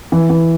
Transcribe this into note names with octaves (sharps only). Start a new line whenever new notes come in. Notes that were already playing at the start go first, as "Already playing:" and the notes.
E3
E3